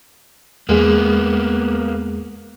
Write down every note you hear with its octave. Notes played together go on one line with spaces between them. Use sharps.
E2 G#3 A#3 B3 G#4